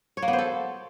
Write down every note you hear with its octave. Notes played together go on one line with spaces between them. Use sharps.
C#5
A#3
B3
C5
A4